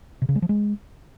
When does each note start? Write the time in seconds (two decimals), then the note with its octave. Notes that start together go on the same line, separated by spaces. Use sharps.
0.22 C3
0.29 C#3
0.35 G#3
0.42 F3
0.49 G#3